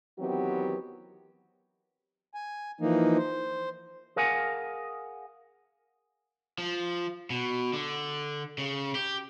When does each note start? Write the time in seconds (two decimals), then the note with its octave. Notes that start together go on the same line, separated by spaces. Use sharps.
0.19 D#3 E3 F#3 B3 C4 G4
2.35 G#5
2.81 E3 F3 A#3 D#4
3.18 C5
4.16 G#4 A#4 F5 F#5 G#5
6.58 F3
7.30 B2
7.73 D3
8.58 C#3
8.95 G4